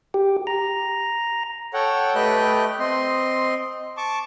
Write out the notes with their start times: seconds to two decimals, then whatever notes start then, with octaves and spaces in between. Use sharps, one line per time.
0.14 G4
0.47 A#5
1.74 A4 C#5 F#5 G5
2.15 A3 G4 B4 D#5 G5 F#6
2.80 C4 D#5 C6
3.97 A5 C#6 D6